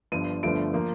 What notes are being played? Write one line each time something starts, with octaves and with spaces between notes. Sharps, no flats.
G1 G2 F3 D#7
G1 G2 D3 F3 A3 D7
F3 A#3